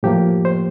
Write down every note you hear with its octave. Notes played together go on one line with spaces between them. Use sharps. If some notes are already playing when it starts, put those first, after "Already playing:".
A2 F3 A#3 G4
C5